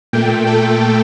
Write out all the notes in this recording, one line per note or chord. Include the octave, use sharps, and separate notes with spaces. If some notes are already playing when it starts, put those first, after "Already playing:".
A#2 A3 G5
A4